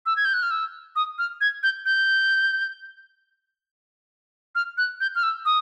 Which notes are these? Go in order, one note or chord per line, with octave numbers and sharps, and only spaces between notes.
E6
G#6
G6
F#6
F6
E6
D#6
F6
G#6
G6
G6
F6
F#6
G6
F6
E6
D#6